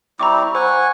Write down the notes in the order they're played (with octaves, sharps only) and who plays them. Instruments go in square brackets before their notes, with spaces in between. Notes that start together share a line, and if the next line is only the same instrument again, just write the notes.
[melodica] G3 C4 E4 [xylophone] A#5 C#6 D6
[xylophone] C5 [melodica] F#5 G#5 C#6